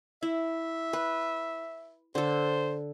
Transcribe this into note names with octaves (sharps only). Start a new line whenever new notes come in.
E4 E5
B4
D3 A4 C5